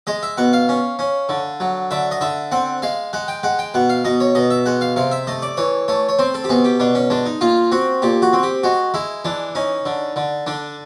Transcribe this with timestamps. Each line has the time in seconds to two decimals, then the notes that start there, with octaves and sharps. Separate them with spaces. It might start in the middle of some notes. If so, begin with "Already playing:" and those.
0.07 G#3 D#5
0.23 E5
0.37 B2 F#5
0.53 F5
0.69 C#4
0.99 C#4
1.29 D3
1.60 F#3
1.91 D3 E5
2.11 D#5
2.21 D3 E5
2.52 C4 F#5
2.82 G#3 F5
3.13 G#3 F#5
3.28 G5
3.43 G#3 F#5
3.59 G5
3.74 B2 F#5
3.89 F5
4.05 B2 D#5
4.20 C#5
4.35 B2 D#5
4.50 E5
4.66 G#3 F#5
4.81 F5
4.96 C3 F5
5.11 E5
5.27 A3 D#5
5.42 D5
5.57 E3 C#5
5.88 A3 C#5
6.09 C#5
6.19 C4 C5
6.34 A4
6.44 G4
6.49 B2 G#4
6.65 G4
6.80 B2 D4
6.95 C#4
7.10 G#3 D4
7.26 D#4
7.41 A#2 F4
7.71 C4 F#4
8.02 A#2 G4
8.22 F#4
8.33 C4
8.43 G4
8.63 G#3 F#4
8.94 G#3 E4
9.25 E3 D4
9.55 C#4 D#4
9.86 D3
10.16 D3
10.46 D3 D4